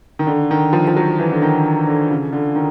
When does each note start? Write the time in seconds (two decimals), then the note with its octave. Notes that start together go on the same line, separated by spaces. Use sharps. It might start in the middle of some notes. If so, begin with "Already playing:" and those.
0.19 D#3
0.27 D3
0.51 D#3
0.73 F3
0.87 F3
0.96 F#3
1.19 E3
1.32 D3
1.42 D#3
1.87 D3
2.11 C#3
2.33 D3
2.56 D#3